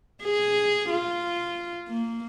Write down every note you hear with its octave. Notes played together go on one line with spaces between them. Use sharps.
G#4
F4
A#3